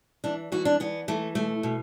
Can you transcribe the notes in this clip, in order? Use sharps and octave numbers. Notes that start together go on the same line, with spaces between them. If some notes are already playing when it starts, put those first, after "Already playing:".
E3 D4
E3 F#4
D4
E3 B3
E3 A3
B2 A3
B2